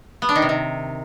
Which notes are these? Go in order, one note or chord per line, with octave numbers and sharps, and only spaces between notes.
B3
D4
D#3
C3
D#3